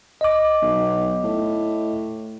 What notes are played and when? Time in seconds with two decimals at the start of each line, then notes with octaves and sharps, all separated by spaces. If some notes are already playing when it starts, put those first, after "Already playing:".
0.21 D#5 D6
0.62 B1
1.23 A2